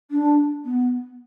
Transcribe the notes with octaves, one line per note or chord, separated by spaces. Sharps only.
D4
B3